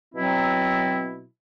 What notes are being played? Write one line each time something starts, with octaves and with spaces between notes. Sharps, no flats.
B2 F#3 C4 E4